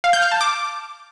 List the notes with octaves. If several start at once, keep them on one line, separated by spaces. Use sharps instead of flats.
F5
G6
F6
A5
D6